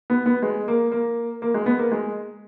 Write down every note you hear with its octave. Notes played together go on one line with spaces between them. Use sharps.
B3
B3
G#3
A#3
A#3
A#3
G#3
B3
A#3
G#3